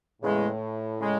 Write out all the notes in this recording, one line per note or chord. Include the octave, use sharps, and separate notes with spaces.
E2 A2 C#3 G#3
C#3 G#3